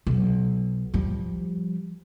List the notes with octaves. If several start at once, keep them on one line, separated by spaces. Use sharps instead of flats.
B1
F3 G3